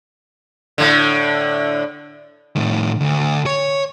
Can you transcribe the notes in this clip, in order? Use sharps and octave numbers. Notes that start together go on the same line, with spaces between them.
A2 D3
A2 D#3
D2
C#5